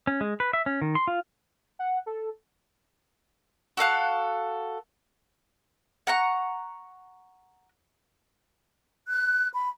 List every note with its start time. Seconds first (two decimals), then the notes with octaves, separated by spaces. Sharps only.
0.07 C#4
0.21 G#3
0.40 B4
0.53 E5
0.66 C#4
0.82 D#3
0.95 C6
1.08 F4
1.79 F#5
2.06 A4
3.77 F#4 A4 F5 F#6
6.07 F#5 A#5 C#6
9.09 F#6
9.53 B5